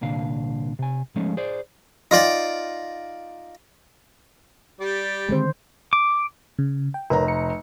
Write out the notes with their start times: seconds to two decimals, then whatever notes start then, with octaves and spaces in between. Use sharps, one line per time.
0.01 C2 A#2 D3 F5
0.79 C3 G#5
1.16 F3 G#3 A3 C#4 D#4
1.37 G#4 C5 D5
2.11 D#4 F4 D5 G5
4.81 G3 G4 D5
5.29 D3 D#3 G#3 A3 C4 C5
5.93 D6
6.59 C#3
6.94 G5
7.10 F1 A#4 B4 C#5 A#5
7.28 C#7